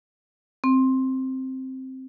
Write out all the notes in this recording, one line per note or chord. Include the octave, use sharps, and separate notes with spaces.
C4